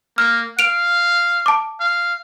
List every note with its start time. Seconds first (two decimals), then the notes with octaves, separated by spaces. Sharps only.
0.18 A#3 F6
0.59 F5 D7 F7
1.46 A5 D6
1.80 F5